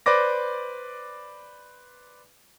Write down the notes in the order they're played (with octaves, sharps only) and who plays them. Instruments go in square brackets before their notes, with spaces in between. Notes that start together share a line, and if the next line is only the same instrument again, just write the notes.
[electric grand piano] B4 C5 D5 D6 A#6